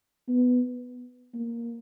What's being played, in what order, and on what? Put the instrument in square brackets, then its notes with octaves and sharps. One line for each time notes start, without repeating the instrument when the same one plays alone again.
[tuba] B3
A#3